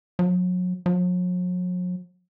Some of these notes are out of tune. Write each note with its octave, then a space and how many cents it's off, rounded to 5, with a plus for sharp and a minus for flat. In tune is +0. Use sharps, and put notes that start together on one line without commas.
F#3 -35
F#3 -45